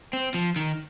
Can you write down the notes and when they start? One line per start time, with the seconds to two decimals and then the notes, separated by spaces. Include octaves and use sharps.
0.13 C4
0.34 F3
0.56 D#3